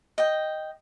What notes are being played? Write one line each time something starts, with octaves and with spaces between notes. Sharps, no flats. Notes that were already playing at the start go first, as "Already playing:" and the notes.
D#5 G5